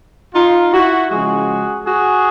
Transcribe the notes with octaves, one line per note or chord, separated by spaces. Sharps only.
D#4 F4
E4 F#4
C#3 F3 G#3 F#4 G#4
F#4 G#4